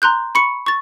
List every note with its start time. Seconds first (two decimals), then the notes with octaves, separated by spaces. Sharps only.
0.02 A#5 C6 F#6 G6
0.35 B5 C#6 C#7
0.66 C#6 A6